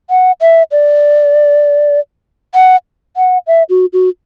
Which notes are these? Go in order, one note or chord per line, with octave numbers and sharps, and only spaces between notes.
F#5
E5
D5
F#5
F#5
E5
F#4
F#4